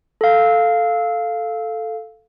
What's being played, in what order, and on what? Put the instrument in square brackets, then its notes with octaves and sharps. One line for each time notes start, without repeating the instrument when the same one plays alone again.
[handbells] A4 F5